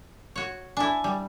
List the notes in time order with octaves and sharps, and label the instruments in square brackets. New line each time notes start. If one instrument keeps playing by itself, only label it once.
[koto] F#4 C#5
[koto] D4 E4 [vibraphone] G#5
[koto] G3